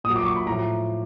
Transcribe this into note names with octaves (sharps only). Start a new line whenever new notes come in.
A#2 D#6
F#3
D6
C#6
B5
A2 F3 A#5